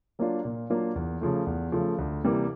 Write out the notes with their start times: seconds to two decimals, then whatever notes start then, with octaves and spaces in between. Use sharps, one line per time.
0.19 F#3 A#3 D4 F4
0.45 A#2
0.70 F#3 A#3 D4 F4
0.96 E2
1.21 C#3 F3 A3
1.47 E2
1.72 C#3 F3 A3
1.98 D2
2.24 C3 E3 G3 A#3